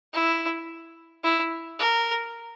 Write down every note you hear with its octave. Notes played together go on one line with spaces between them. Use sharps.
E4
E4
A#4